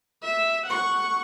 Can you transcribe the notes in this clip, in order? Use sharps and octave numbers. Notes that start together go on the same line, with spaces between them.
E5
F#5 C#6